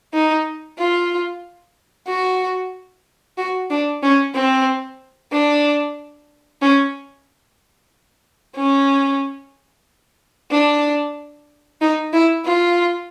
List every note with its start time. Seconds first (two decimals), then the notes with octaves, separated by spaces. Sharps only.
0.14 D#4
0.78 F4
2.08 F#4
3.38 F#4
3.70 D4
4.03 C#4
4.35 C4
5.32 D4
6.62 C#4
8.56 C#4
10.51 D4
11.81 D#4
12.13 E4
12.45 F4